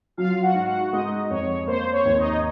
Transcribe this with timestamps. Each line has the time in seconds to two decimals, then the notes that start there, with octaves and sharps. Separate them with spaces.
0.17 F#3 F4 F5
0.42 F#4 F#5
0.55 G#2
0.67 F#4 F#5
0.92 G#3 D#4 D#5
1.30 F2 C#5
1.67 A#3 C5
1.92 C#5
2.05 D#2
2.17 D#4 D#5